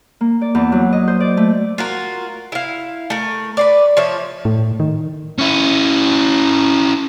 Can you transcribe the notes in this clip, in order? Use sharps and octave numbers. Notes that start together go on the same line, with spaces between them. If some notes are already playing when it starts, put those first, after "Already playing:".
A#3
D5
E2
F#3
D#5
C5
D5
A3
F4 F#4 A#4
E4 F5
A3 A#4
B4 C5 D5
F3 C#5 E5
A2
D#3
C#4 E4